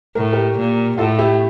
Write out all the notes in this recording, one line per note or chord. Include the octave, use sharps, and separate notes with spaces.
A2 A#4
G4 A#4
A#2
A2 F4 A4
E4 G4